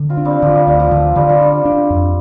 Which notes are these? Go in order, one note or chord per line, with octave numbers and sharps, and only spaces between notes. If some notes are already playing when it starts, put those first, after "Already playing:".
Already playing: D3
C4 F4
D4
G3 C4
D3 F3
G3
D2 G3
F3
D3 F3
D3 G3
F3
G3 D4
D4
F2